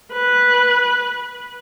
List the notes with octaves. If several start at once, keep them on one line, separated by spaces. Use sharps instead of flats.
B4